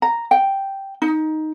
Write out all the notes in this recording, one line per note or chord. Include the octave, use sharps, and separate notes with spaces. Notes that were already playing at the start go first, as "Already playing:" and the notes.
A#5
G5
D#4